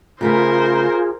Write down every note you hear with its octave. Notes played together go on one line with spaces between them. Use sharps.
C#3 A3 B3 F4 G#4 A#4 C5